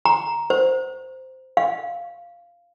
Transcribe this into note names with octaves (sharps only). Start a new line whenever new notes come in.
A#5
C5
F5